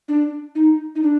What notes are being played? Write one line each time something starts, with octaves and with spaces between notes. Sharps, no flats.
D4
D#4
D#4
D4